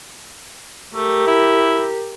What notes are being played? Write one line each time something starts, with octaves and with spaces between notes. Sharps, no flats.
A3 G4 A#4
E4